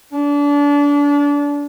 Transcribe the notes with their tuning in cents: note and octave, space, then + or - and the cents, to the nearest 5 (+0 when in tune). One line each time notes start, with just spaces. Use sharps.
D4 -30